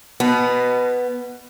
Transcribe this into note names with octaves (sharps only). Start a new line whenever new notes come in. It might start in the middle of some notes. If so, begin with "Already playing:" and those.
B2 B3